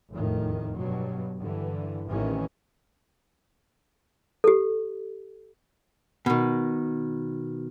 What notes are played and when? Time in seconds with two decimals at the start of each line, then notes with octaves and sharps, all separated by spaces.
0.12 F1 E2 A2 D#3
0.76 G2 B2 F#3
1.39 G2 D3 E3
2.07 A1 C3 D#3 E3 C#4
4.44 G4 A4
6.26 B2 D#3